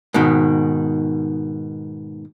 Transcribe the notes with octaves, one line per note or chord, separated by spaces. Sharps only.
G#2 B2 D#3